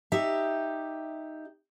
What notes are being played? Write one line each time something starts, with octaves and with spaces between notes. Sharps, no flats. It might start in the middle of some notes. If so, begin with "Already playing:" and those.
D#4 G4 E5